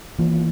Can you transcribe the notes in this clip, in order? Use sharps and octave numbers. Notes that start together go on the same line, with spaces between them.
E3 A#3 F4